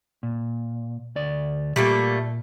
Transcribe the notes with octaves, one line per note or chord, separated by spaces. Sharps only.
A#2
D2 D5
A#2 G3 A3 A#3